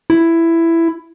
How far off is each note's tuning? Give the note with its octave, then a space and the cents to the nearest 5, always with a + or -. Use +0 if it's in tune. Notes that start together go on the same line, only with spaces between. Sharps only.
E4 +10